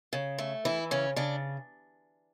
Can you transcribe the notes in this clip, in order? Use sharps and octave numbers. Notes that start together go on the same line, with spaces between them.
C#3
A3
E3 E4
C#3 C#4
C#3 D4